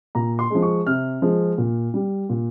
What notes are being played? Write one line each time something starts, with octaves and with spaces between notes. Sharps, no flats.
A#2 A#5
C6
F3 G#3
C#6
C3 F6
F3 G#3
A#2
G3
A#2